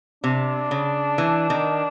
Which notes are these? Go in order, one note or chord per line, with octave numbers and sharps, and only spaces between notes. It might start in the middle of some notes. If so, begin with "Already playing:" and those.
C3 D4
C#3
E3
D#3